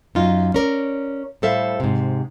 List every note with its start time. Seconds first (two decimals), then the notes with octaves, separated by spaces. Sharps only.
0.15 F#2 D#4 F4
0.54 C#4 A#4 D5
1.42 A2 G3 A4 C5 E5 F5
1.80 G#2 C3